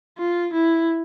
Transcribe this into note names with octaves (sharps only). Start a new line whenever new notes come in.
F4
E4